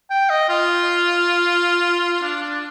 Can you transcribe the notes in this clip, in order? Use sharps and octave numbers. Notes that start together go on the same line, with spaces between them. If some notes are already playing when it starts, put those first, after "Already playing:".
G5
D#5
F4
D4
D4